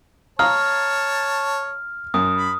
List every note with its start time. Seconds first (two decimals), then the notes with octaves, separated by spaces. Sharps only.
0.39 C#5 F5 A5 A#5 D#6 F6
2.14 F#2 D#6
2.37 B5